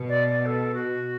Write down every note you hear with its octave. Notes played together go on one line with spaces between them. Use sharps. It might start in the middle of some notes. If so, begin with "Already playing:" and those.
Already playing: B2
D5
D5
A4
F#4